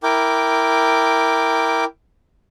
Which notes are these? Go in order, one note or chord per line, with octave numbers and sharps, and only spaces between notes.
E4 A#4 G5 D6